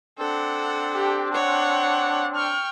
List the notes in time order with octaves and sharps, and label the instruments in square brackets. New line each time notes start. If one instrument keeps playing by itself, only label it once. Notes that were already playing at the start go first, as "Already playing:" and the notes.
[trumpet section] C4 D4 [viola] A4 F#5
[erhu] G4
[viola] C#5 [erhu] F#5
[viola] G5 C#6 [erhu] F6